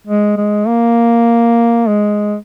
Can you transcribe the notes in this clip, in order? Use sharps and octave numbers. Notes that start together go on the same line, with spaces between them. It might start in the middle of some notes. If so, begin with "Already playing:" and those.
G#3
G#3
A#3
G#3